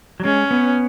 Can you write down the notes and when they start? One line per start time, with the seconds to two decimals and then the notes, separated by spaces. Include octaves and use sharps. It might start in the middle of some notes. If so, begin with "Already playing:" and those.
0.20 F#3
0.25 G#3 C#4
0.51 B3